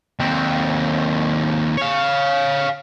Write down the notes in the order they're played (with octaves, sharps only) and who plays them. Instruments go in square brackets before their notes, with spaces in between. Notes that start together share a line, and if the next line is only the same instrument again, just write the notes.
[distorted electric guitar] D#2 C4
C#5 F5